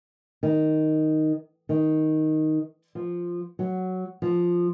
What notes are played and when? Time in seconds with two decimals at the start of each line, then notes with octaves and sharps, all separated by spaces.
0.43 D#3
1.69 D#3
2.95 F3
3.59 F#3
4.22 F3